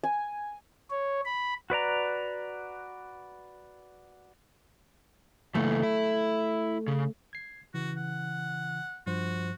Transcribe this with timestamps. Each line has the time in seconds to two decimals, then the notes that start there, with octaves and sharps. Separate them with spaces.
0.03 G#5
0.90 C#5
1.25 B5
1.70 F#4 B4 D5 A#5
5.55 C#3 E3 A3 A#3
5.83 E4 E5
6.88 C#3
7.33 G#6 C7
7.74 C#3 E3 F#4
7.97 F#5
9.07 G2 F3 F#4 C5